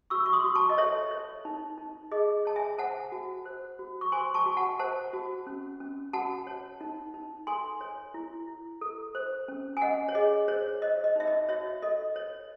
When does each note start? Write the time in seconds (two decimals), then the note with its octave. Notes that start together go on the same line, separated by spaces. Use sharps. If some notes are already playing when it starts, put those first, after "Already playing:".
0.10 F#4 C#6 E6
0.26 C#6
0.33 C6 D#6
0.44 F#4
0.55 A5 C#6
0.70 D#5
0.78 A4 C#5 E5
1.11 C#5
1.45 D#4
1.78 D#4
2.12 G#4 D#5
2.45 C#5 A5
2.56 E5 G#5
2.78 C5 F#5 A5
3.12 F#4
3.45 C5
3.79 F#4
4.01 C#6
4.12 C5 G#5 C6
4.34 A5 C#6
4.46 F#4
4.57 F#5 A5
4.79 C5 F#5 A5
5.13 F#4
5.47 C#4
5.80 C#4
6.13 F#4 F#5 A5
6.47 C#5
6.81 D#4
7.14 D#4
7.47 A4 G#5 C6
7.81 C#5
8.14 E4
8.48 E4
8.81 A4
9.15 C5
9.48 C#4
9.77 G#5
9.82 C#4 D#5 F#5
10.08 C#5
10.15 G#4 D#5
10.48 C5 C#5
10.82 C5 D#5
11.04 D#5
11.16 D#4 E5
11.27 D#5
11.49 F#4 C#5 E5
11.82 A4 D#5
12.16 C#5